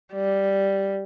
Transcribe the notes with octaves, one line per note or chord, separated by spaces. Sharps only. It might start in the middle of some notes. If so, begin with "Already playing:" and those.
G3